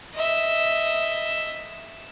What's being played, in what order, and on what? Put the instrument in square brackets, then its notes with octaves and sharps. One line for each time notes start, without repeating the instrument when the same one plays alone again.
[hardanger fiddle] D#5 E5